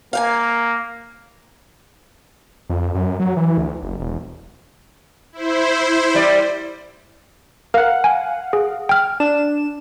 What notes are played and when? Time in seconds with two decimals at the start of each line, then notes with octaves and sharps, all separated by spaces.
0.13 A#3 F5 G5 G#5
2.70 F2
2.95 F#2
3.20 F#3
3.37 E3
3.58 D2
3.83 F#1
4.00 E1
5.32 E4 C5
6.15 G3 D5
7.74 A#4 F5 F#5
8.04 G#5
8.53 G#4
8.89 G5 F6
9.20 D4 E7